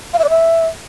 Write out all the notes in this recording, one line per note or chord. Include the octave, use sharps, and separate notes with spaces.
F5
E5
D5
E5